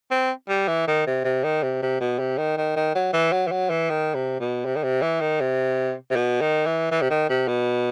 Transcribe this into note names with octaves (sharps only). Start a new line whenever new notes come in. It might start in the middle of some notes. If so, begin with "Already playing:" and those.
C4
G3
E3
D#3
C3
C3
D#3
C3
C3
B2
C3
D#3
D#3
D#3
F#3
E3
F#3
E3
F#3
E3
D#3
C3
B2
C3
D#3
C3
E3
D#3
C3
C3
B2
D#3
E3
E3
C3
D#3
C3
B2